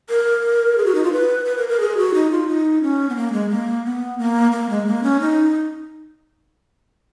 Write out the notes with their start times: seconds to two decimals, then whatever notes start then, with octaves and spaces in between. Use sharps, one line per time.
0.09 A#4
0.78 G#4
0.86 F#4
0.95 D#4
1.04 F4
1.13 B4
1.45 B4
1.58 A#4
1.69 A#4
1.80 G#4
1.97 F#4
2.14 D#4
2.31 F4
2.48 D#4
2.82 C#4
3.09 B3
3.16 A#3
3.33 G#3
3.50 A#3
3.85 B3
4.19 A#3
4.52 A#3
4.70 G#3
4.87 A#3
5.03 C#4
5.20 D#4